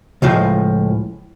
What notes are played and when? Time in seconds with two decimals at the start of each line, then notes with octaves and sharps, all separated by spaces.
0.22 C#2 A2 F3 G#3